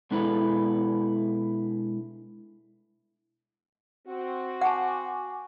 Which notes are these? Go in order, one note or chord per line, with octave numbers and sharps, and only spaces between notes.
B2 G#3 D4 E4 A4 B4
C4 F#4
F#5 G#5 A5 C#6 D6